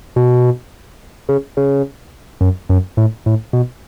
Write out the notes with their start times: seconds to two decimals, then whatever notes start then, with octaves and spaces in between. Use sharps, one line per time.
0.16 B2
1.29 C#3
1.57 C#3
2.41 F#2
2.69 F#2
2.97 A2
3.26 A2
3.53 B2